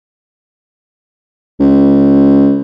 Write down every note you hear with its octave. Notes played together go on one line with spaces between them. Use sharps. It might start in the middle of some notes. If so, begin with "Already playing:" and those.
C#2